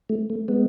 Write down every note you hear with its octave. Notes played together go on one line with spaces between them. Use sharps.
A3
A3
G#3 B3